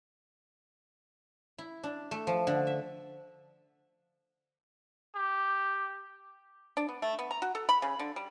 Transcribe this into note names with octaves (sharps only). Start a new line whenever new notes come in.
E4
D4
A3
F3
D3
E5
G4
D4
B3
A3
B3
A#5
F#4
A4
B5
C#3
D3
G3